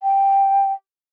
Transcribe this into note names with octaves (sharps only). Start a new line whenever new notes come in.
G5